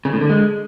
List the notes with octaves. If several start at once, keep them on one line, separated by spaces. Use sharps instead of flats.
C#3
A2
D3
G#3